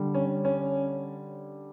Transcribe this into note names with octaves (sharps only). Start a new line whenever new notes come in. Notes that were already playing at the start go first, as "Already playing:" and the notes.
Already playing: D3 G3
C#4
C#4